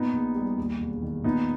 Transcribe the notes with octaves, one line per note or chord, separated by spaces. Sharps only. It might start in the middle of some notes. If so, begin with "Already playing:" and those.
Already playing: A#2 B3 D#4
A#1
G3
D#2
E1
D#3
A#2 B3 D#4